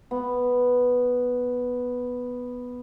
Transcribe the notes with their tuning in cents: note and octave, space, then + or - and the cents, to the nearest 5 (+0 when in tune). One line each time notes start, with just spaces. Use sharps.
B3 +0